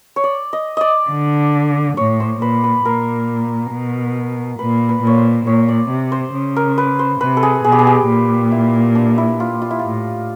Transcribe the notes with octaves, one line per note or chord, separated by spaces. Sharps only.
C#5
D5
D#5
D5 D#5
D3
A2 C#5
C5
A#2 B4
B4
A#2 A#4
B2
A#2 B4
B4
A#2 C#5
C5
A#2 C#5
D5
C3
C5
C#3
A#4
B4
C5
C3 B4
A4
G#4
B2 G#4
G4
G#4
G4
A#2
E4
D4
E4
F4
F4
E4
A2 F4